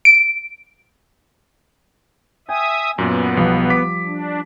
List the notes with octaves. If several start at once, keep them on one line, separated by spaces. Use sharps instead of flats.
D7
E5 G5 G#5 D#6
F#2 A#2 B3
B1 F3 G3
D6 B6
D4